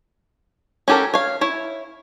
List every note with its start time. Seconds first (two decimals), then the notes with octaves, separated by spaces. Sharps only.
0.88 C#4 F#4 G4 A4 A#4
1.14 C#5 F5
1.41 E4 C#5